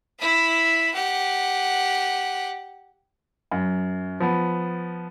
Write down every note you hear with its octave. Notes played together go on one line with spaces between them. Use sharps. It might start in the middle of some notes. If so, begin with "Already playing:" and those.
E4 B5
G4 F#5
F#2
F3 B3